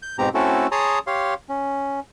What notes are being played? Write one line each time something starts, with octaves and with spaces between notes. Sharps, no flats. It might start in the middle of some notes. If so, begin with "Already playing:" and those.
G6
G#2 B2 C4 G4 A#5
A3 C4 C#4 E4 F#4 A4
G#4 C#5 A5 A#5 C6 D#6
G4 C#5 F5 C6
C#4